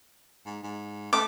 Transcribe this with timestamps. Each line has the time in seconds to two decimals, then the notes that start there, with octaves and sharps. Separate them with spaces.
0.46 G#2
0.63 G#2
1.13 A3 D6